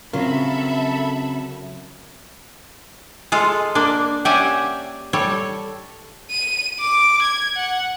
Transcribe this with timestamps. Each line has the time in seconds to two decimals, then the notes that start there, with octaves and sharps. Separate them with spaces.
0.13 C#3 F#3 C4 F4 A4 A#4 E5 B5
3.32 G#3 F4 A4 F5
3.75 A#3 D4
4.25 C#4 G4 D5 E5 F#5 G#5
5.13 G3 A4 C#5
6.30 D#7
6.79 D6
7.22 G#6
7.56 F#5